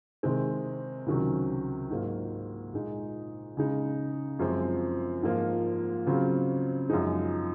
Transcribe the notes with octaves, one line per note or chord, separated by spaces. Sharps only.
C3 D#3 G#3 C4
C#2 C3 D#3 F#3 C#4
G#2 F#3 A#3 F4
A#2 G#3 D#4
C#3 G#3 D#4
F#2 F3 G#3 C4
G#2 F3 A#3 F4
C#3 F#3 C4 F4
F#2 F3 G#3 D#4